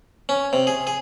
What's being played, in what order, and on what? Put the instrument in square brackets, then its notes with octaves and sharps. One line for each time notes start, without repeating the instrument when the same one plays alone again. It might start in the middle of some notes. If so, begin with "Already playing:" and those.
[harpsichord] C#4
C3
G#4
G#4